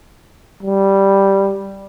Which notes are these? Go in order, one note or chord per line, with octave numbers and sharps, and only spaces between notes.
G3